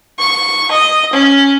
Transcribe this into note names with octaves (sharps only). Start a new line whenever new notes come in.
C#6
D#5
C#4